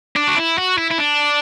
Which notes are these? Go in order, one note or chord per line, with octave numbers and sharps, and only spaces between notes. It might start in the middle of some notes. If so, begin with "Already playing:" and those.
D4
F#4
E4
F#4
E4
E4
D4